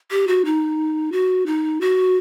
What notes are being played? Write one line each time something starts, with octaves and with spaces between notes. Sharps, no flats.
G4
F#4
D#4
F#4
D#4
F#4